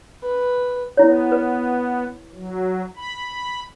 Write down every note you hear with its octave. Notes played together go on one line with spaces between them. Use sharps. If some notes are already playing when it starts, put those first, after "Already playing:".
B4
B3 E4 C#5
B4
F#3
B5